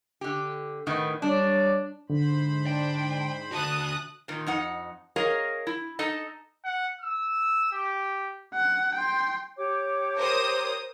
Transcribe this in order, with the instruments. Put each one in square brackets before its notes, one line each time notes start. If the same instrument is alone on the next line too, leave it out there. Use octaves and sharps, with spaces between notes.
[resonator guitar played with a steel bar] D3 G4
A2 D#3 B3
[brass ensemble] G3 C#5 D5 [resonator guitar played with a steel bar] D4
[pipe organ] G#2 C5 B5 [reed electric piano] D3
[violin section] D4 [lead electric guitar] G5
[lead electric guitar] D3 F#4 [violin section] A5 D#6 F#6
[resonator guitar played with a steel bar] A#2 D#3
F2 D#4 F#5
G#4 A#4 C#5 D#5 F5
E4
D#4 A4 D#5
[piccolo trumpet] F#5
E6
G4
[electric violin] F#5
G5 C6
[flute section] G4 C#5 D6
[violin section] A#4 C5 D#6